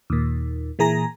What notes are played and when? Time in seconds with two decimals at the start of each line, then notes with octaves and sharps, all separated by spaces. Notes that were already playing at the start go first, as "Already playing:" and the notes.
0.10 D#2 A#2
0.79 A#2 E3 G#4 A#5 A#6